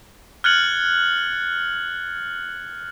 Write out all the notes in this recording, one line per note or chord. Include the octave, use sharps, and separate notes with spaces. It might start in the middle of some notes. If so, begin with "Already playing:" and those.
F6 F#6 G#6 A6 C#7 F#7